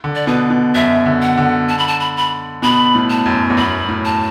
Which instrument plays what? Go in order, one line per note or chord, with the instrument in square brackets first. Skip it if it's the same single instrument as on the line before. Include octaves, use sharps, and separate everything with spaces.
[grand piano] D3
[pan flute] D5
[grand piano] B2 [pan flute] B4
[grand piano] B2
[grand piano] F#2 [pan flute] E5
[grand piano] D3
[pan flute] F#5
[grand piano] D3
[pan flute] A5
B5
A5
B5
B5
[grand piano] B2 [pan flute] B5
[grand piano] A2
[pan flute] A5
[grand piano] F#2
E2
[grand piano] F#2 [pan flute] B5
[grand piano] F#2
A2
[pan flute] A5